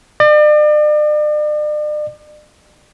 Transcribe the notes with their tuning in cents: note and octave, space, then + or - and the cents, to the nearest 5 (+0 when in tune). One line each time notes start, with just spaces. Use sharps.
D5 +40